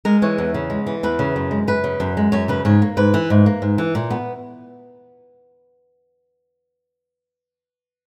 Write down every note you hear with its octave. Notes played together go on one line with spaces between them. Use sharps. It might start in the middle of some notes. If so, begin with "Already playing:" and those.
G#3 A#4
E3 C#5
E2
C#3
G#3
E3
E2 B4
C#3
F#2
G#3
F#2 B4
C#3
F#2
G#3
F#2 C#5
C#3 B4
G#2 C#5
A#3
G#2 B4
E3
G#2
A#3
G#2
E3
A#2
B3